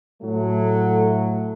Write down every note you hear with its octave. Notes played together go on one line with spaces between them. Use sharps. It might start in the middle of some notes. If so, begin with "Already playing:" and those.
A2 F#3 A3